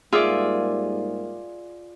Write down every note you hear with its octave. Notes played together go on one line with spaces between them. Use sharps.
G#2 G3 A#3 F4 G#4 D5 E5